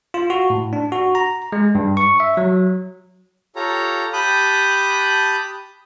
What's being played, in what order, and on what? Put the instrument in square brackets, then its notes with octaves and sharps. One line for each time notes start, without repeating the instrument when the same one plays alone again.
[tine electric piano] F4
F#4
A2
D4
F#4
A#5
G#3
G2
C#6
E5
F#3
[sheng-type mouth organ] F4 G4 A4 C#5 A#5
G4 A5 B5 D#6 F#6 G6